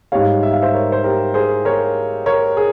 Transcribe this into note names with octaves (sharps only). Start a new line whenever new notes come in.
G#2 G3 C#5 F5
E5
F5
C5 E5
A#4 C#5
C5
G4 A#4
G#4 C5
A#4 C#5
A#4 C#5
G#4